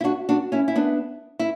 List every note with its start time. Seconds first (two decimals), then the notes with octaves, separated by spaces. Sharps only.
0.01 E4
0.04 D4 F#4
0.29 D4 F#4
0.52 C#4 E4
0.68 E4
0.76 B3 D4
1.39 E4